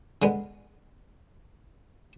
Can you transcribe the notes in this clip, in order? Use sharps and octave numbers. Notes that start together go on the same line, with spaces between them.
D3 G#3 B3